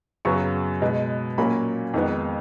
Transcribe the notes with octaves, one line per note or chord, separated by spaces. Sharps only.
F#2 C#3 F#3 B3 C#6
B2 G#3 D#4
A#2 F#3 A#3 C#4 B5
F2 D#3 G#3 B3